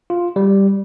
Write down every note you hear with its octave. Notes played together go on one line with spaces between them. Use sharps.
F4
G3